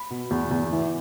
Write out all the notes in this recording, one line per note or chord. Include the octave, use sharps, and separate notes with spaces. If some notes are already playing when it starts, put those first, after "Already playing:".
Already playing: B5
B2
E2
E2
E3